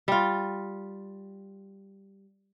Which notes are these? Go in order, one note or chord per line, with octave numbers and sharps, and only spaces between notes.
G3 F4